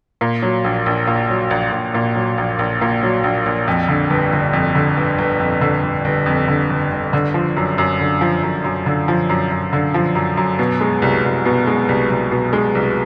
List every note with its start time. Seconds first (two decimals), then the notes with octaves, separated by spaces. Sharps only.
0.21 A#2
0.42 F#3
0.64 A#1
0.86 A#1
1.07 A#2
1.30 F#3
1.51 A#1
1.72 A#1
1.94 A#2
2.16 F#3
2.38 A#1
2.59 A#1
2.81 A#2
3.03 F#3
3.24 A#1
3.46 A#1
3.68 F2
3.88 D3
4.10 G1
4.33 G1
4.53 F2
4.75 D3
4.97 G1
5.18 G1
5.40 F2
5.61 D3
5.83 G1
6.05 G1
6.26 F2
6.48 D3
6.70 G1
6.91 G1
7.13 D3
7.34 F3
7.57 F#2
7.78 F#2
8.00 D3
8.21 F3
8.43 F#2
8.64 F#2
8.86 D3
9.08 F3
9.29 F#2
9.51 F#2
9.73 D3
9.94 F3
10.15 F#2
10.37 F#2
10.59 B2
10.81 G#3
11.02 C2
11.24 C2
11.46 B2
11.67 G#3
11.89 C2
12.10 C2
12.32 B2
12.53 G#3
12.75 C2